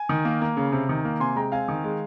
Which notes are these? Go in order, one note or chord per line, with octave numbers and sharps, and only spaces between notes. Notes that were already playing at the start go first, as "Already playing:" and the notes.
Already playing: G#5
D#3
A#3
A#3
C#3
C3
D#3
A#3
C3 G#5 C6
G#3 G5 A#5
C4 F5 G#5
D#3
G#3